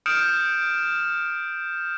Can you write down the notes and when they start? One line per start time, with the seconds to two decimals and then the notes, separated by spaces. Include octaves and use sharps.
0.06 D#6 F6 G6 C#7 D7 E7